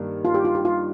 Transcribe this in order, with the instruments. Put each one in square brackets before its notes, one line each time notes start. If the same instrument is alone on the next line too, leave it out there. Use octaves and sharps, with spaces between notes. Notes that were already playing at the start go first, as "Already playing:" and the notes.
Already playing: [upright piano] G2 D#3 A#3
[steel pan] F4
G4
F4
G4
F4